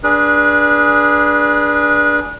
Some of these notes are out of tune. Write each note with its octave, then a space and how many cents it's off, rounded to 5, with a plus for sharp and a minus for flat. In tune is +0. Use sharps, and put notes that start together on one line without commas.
D4 +0 G#4 +0 B4 -30